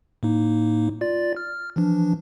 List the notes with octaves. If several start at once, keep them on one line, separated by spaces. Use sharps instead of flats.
A2 A#3 D#4
F4 D5 A6
F6
E3 F3 D4